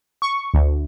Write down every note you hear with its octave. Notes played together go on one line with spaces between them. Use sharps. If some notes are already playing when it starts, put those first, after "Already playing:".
C#6
D2